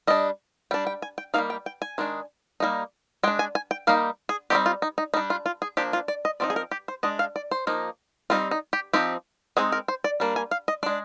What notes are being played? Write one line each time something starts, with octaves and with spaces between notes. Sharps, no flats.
G3 D4 D#5
G3 D4 G5
G5
G#5
G5
G3 A#3 D#4 F5
G5
G5
G#5
D#3 G#3 D4
G3 A#3 D#4
G#3 D4 G5
G#5
G#5
G5
G3 A#3 D#4 F5
G#4
G3 C4 D#4 G4
F4
D#4
D#4
G3 D4 D#4
F4
F4
G#4
F3 A#3 D4 G4
F4
D5
D#5
F3 C4 D#4 D5
G#4
A#4
G4
C5
G#3 D4 D#5
F5
D5
C5
F3 A#3 D#4
G3 C4 D#4 F4
D#4
G4
F3 C4 D#4 G4
G#3 C4 D#4 G#4
A#4
C5
D5
G3 A#3 D4
G#5
F5
D#5
G#3 D4 D5